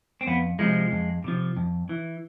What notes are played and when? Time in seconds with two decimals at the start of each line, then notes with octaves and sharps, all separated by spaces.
0.21 C4
0.27 F2 B3
0.59 C3 F3 G#3
0.92 F2
1.24 C3 F3
1.57 F2
1.89 E3